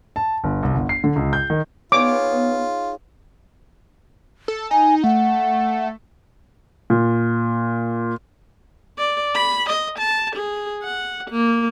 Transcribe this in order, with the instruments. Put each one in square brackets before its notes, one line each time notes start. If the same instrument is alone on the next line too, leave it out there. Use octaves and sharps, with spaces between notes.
[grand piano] A5
G1
C2
G1
C7
D3
C#2
G6
D#3
[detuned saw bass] B3 [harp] D#4 G#4 C#5 [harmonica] F4 [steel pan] D6
[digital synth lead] A4
[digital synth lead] D#4 [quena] G#5
[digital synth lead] A3 [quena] F#5
[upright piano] A#2
[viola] D5
B5
D#5
A5
G#4
F#5
A#3